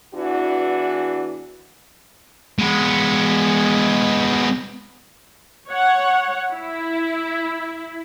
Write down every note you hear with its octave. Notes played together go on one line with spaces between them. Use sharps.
E2 E3 D4 F#4
G#3 B3
C#5 F#5
E4